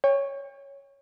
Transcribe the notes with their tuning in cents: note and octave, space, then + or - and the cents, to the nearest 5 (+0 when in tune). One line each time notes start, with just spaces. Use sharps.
C#5 +0 G5 +40